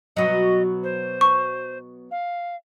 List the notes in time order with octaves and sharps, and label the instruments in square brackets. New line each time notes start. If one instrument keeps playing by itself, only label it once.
[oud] B2 F#3 [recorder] D#5
[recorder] C5
[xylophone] C#6
[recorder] F5